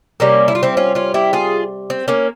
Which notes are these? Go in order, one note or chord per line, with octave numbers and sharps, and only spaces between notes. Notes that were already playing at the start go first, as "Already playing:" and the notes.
C3 G3 A#3 C#4
E4
F4
C4 E4
C#4 F4
C#4 F4
E4 G4
F4 G#4
C4
A#3 C#4